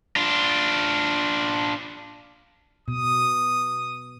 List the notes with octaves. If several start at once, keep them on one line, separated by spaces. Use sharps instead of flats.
D4 F4
B2 D#6